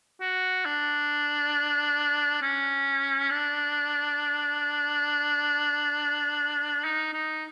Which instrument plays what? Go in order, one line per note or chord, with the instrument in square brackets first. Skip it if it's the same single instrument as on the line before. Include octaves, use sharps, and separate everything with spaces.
[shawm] F#4
D4
C#4
D4
D#4
D#4